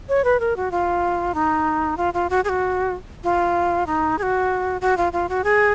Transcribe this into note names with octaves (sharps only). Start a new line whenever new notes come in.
C#5
B4
A#4
F#4
F4
D#4
F4
F4
F#4
G#4
F#4
F4
D#4
G#4
F#4
F#4
F4
F4
F#4
G#4